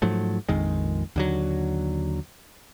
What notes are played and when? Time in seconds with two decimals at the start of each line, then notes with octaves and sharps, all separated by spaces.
0.02 G#2 F3 F#3 A3
0.49 A#1 F2 D#3 G#3
1.16 D#2 D3 F#3